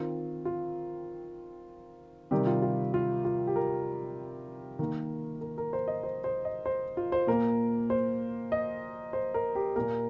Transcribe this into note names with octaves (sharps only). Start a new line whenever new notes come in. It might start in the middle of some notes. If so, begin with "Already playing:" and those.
Already playing: D#3 C4 F4
F4
C3 D#3 G3 G4
F4
F4
F4
F4
G4
A#4
D#3 A#3
A#4
A#4
C5
D#5
C5
C5
D#5
C5
F4
C5
A#2 A#3 A#4
C5
D#5
C5
A#4
G4
A#2 A#3 A#4